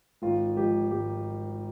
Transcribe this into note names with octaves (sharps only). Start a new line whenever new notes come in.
G#1 F4
G#2 F3 G4
G#1 G4